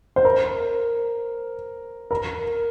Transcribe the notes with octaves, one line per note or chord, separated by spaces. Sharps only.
C5
A#4
A#4